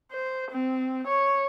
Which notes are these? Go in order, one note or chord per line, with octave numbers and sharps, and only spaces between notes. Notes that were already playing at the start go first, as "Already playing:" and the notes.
C5
C4
C#5